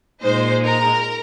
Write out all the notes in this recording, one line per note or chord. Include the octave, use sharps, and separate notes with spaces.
A#2 G#3 D#4 C5
A#4